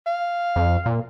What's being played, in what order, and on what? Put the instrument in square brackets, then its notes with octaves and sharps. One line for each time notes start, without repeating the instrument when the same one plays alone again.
[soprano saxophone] F5
[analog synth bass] F2
A#2